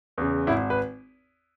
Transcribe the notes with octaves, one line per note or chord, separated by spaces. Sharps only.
E2 C#3
G#1 E4
B4